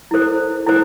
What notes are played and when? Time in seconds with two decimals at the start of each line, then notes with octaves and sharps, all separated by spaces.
0.11 E4 A4 C5
0.67 E4 A4 C5